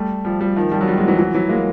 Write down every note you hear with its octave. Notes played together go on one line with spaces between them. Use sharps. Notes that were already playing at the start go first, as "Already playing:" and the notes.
Already playing: G3 A3
F3 G3
F3 G3
D#3 F3
F3 G3
F#3
F3 G3
F#3 G#3
E3 F#3
E3 F#3
E3 F#3
G#3 A#3